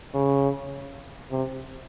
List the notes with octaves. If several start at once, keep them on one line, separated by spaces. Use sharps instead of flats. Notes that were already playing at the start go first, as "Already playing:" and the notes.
C#3
C3